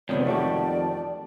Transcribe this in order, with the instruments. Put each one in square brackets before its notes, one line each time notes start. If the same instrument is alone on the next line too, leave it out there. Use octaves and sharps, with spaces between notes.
[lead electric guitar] F2 D#3 [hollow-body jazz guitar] G#2 C3 B3 [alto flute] C#5 [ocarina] D5
[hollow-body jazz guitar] A3 F#4 G4 [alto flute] A5